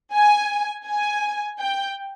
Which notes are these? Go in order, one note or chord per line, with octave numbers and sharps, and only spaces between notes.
G#5
G#5
G5